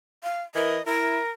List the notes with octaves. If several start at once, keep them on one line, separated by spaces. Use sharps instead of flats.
F5
E3 A#4 D#5
E4 A#4